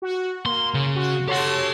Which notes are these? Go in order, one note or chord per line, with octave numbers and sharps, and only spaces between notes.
F#4
A#3 C6
C#3
F#4
G4 A4 C#5 F#5 C6